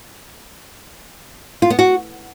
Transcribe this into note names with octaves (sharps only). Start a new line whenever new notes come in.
F4
B3
F#4